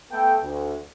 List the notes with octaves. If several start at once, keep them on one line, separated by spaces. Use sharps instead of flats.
A3 B3 A4 G5
D2